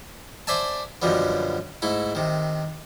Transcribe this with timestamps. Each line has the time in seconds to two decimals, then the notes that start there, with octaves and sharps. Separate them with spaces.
0.47 C5 D5 E5 G#5 A5
1.02 F#2 B2 D3 F3 G3 B3
1.82 G#2 A3 E4
2.15 C3 D#3